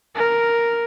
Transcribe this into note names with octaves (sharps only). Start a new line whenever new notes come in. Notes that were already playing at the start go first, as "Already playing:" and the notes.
A#4